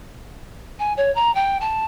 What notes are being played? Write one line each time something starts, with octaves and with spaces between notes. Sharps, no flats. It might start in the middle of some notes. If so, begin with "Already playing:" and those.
G#5
C#5
A#5
G5
A5